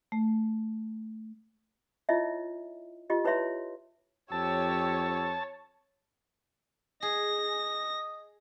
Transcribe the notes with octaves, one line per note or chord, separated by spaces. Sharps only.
A3
E4 F4 C#5 D#5 E5
F4 G4 D#5
E4 B4 C#5 E5 C6
F2 G4 C#5 A5 E6
G#4 D#5 A#6